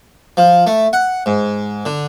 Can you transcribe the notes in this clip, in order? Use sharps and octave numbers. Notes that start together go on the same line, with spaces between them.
F3
A3
F#5
G#2
D3